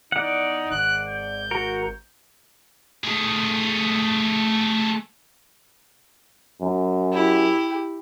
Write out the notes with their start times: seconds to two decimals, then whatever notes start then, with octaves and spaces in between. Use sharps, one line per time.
0.12 E2 D#4 D5 F#5
0.71 G#1 F#6
1.08 G6
1.51 F#4 A#4
3.04 A3 G#4
6.61 F#2
7.13 E4 G4